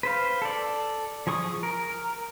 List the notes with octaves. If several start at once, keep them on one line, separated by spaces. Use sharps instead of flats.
B4 C5 F5
A4 D5
F3 G#4 C#6 D#6
A#4